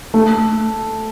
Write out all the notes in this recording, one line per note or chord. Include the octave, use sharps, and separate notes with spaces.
A3